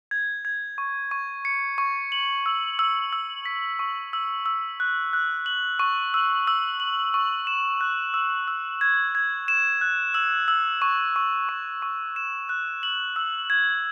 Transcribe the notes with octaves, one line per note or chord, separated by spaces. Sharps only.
G#6
G#6
C#6
C#6
C#7
C#6
F#7
E6
E6
E6
B6
C#6
E6
E6
F#6
F#6
F#7
C#6
E6
E6
F#7
C#6
E7
F#6
E6
E6
G#6
G#6
E7
F#6
E6
E6
C#6
C#6
C#6
C#6
E7
F#6
F#7
E6
G#6